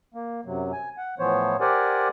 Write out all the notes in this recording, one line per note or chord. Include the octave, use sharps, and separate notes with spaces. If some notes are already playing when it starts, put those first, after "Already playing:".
A#3
F#2 C3 F#3
G#5
F#5
A2 E3 F3 B3 C5 C#5
G4 A#4 C5 D5 F#5 G#5